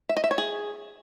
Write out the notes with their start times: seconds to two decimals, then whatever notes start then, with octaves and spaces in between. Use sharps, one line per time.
0.09 E5
0.17 D#5
0.24 E5
0.31 C#5
0.38 G#4